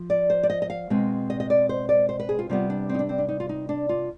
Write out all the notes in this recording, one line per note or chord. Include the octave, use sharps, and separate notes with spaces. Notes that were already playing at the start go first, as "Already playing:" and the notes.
Already playing: F3
D5
C5
D5
D#5
D#5
F5
B2 G#3 C4
D#5
D#5
D5
C5
D5
C5
B4
G#4
F4
C3 G3 B3 F4
D4
C4 D#4
D4
C4
D4
D#4
F4
D#4
D4
F4